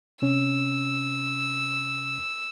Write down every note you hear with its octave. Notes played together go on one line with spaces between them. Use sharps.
C3 C#4 E6